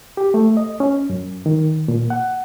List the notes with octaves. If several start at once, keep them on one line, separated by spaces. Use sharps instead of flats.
G4
A3
D#5
C#4
F#2
D#3
A#2
F#5